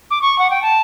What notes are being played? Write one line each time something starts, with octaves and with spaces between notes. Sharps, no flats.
D6
C#6
F#5
G5
A5